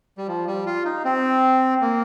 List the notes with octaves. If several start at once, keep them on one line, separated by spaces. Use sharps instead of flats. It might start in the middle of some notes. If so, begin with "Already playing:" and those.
G3
F3
G3
F4
D#4
C4
A#3